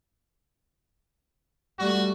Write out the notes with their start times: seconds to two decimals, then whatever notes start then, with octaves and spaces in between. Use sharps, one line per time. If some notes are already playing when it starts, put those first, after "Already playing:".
1.79 G3 A3 F#4